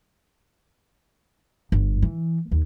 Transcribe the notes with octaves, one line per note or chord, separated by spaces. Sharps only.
G1
E3
D#2